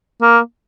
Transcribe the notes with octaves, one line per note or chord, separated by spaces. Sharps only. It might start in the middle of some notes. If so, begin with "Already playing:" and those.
A#3